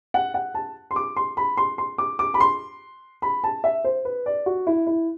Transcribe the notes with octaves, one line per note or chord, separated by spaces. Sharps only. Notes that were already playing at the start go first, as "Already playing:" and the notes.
F#5
F#5
A5
C6
D6
C6
B5
C6
C6
D6
D6
B5
C6
B5
A5
E5
C5
B4
D5
F#4
E4
E4